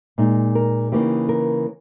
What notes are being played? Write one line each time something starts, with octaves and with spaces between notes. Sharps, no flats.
A#2 G#3 D#4
A#4
C#3 E3 A#3 D#4 G4
A#4